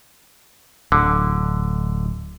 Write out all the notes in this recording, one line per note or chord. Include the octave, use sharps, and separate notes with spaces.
D1 D3